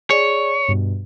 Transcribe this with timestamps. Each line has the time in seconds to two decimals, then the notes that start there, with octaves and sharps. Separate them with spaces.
0.10 G#4 C#5 D5
0.68 G2 B2